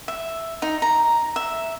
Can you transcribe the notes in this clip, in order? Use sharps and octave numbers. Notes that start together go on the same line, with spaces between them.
E5
D#4
A#5
E5